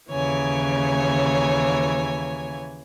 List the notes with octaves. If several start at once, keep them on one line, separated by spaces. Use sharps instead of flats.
D#2 C#3 E3 C#5 G#5